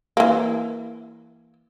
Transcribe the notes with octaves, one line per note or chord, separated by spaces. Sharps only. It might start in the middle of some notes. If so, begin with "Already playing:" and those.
E3 A#3